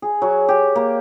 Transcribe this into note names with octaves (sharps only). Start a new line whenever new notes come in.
G#4
F#3
G4
A#3